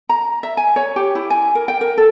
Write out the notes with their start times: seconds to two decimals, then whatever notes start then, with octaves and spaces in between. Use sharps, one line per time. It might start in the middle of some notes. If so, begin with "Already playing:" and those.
0.09 A#5
0.43 E5
0.57 G#5
0.76 C#5
0.96 G4
1.15 E4
1.30 G#5
1.55 A#4
1.68 G5
1.81 A#4
1.98 A4